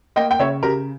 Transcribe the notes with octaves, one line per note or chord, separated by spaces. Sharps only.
A#3 D#5 G5
G5
C#3 C#5 E5
C#3 G4 A#4